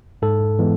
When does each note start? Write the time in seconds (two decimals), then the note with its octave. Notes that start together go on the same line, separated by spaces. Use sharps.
0.22 G#2 A4
0.59 E3 G#3 B3